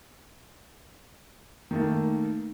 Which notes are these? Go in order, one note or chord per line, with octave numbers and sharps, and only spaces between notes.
D#3 A3 A#3